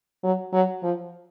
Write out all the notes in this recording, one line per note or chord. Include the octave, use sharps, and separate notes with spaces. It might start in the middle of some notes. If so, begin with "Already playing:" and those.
F#3
F#3
F3